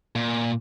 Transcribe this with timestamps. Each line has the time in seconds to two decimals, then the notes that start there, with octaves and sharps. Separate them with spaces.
0.16 A#2